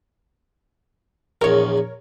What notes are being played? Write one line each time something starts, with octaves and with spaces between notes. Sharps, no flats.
A#1 E2 A#4 C#5